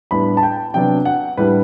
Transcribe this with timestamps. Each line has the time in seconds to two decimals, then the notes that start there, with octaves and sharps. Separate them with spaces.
0.11 A2 G3 B3 D4 B5
0.37 A5
0.43 G5
0.74 C3 F#3 B3 D4 G5
1.05 F#5
1.37 A2 G3 D4 B4